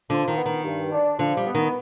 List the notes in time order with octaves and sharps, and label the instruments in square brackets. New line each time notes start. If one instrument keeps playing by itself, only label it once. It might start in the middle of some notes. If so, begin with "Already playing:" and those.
[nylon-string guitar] D3 [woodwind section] F3
[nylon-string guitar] D#3
[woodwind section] B3
[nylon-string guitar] D#3
[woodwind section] G2
D4
[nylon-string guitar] D3 [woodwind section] F3
[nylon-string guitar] G3
[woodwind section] B3
[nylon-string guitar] D#3